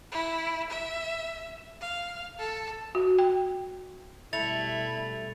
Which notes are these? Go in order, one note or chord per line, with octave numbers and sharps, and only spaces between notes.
E4
E5
F5
A4
F#4
G5
B2 G3 A3 E4 A6 F7